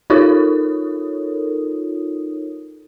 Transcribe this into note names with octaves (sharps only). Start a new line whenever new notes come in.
D#4 F4 A4 A#4 C#5 D#6